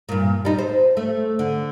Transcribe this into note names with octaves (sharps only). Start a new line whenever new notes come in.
G2 A#2
G3 D#4
C5
A3
D3